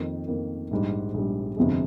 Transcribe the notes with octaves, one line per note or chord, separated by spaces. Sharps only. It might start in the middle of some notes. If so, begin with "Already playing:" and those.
Already playing: F2 D#3 A#3
F2 D#3 A#3
A#1 G#2 G3
A#1 G#2 G3
G1 F2 C3 F3 G#3